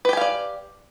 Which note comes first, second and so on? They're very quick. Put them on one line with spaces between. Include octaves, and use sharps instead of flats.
B4 G4 G#5 F5 D5